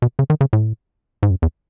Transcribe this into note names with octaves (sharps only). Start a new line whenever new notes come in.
B2
C#3
D#3
C#3
A2
G#2
F#2
E2